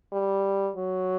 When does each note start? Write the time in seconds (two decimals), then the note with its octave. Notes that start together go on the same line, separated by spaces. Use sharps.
0.12 G3
0.76 F#3